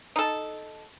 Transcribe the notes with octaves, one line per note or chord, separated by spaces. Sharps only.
D#4 A4